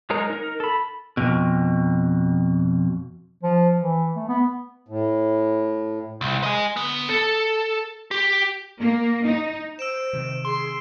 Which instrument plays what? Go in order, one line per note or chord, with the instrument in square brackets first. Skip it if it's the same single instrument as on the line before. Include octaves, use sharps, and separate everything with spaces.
[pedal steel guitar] F#3 G#3 D#4 A#4 A#5
D#4 A#4
A4 B5
[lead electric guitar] F2 B2
[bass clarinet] F3
E3
A3
B3
[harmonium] A2
[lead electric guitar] C2
D#5 G#5
D3 B3
A4
G4
[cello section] A#3
D#4
[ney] C5 [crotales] E6 D7 E7
[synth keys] C3 D#3
[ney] G#4 [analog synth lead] C6